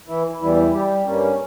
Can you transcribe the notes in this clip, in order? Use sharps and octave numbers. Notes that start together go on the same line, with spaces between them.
E3 E4
E2 E3 G3 E4
G3 G4
G2 G3 A#3 C#4